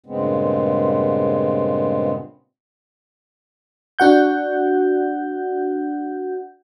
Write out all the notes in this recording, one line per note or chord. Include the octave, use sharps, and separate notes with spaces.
G2 A#2 C#3 G#3 B3 C4
D4 F#4 F#5 G6